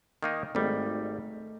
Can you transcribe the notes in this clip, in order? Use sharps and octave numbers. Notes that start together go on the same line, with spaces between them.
D#3 A#3 D#4
G#1 G3 A3 D#4